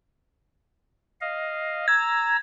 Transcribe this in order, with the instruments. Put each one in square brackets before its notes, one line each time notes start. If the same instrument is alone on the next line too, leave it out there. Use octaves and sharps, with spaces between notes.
[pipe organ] D#5 F5
[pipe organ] A#5 E6 [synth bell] G#6